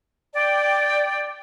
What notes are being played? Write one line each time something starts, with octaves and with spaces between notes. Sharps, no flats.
D5 G5